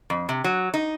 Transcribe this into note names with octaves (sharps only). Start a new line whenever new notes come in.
F2
C3
F#3
D#4